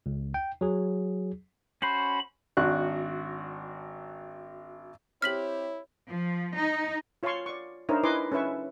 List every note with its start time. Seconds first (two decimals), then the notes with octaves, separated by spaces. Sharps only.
0.06 C#2
0.34 G5
0.61 F#3 G#4
1.82 C#4 F#4 C5 B5
2.57 G#1 D4 F#4 F#6
5.22 C4 E4 G4 C#5 F6 B6 F#7
6.09 F3
6.56 D#4
7.23 F4 C#5 F5 A5 C6 C#6
7.46 D5 C#6
7.89 D4 D#4 A#4 C5 C#5 E5
8.03 E4 B4 D#5 G#5 C6 D6
8.32 C#4 A4 B4 E5 C#6